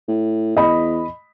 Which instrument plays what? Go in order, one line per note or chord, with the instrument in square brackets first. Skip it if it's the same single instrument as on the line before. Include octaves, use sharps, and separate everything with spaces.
[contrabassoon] A2
[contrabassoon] E2 [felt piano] D#5 B5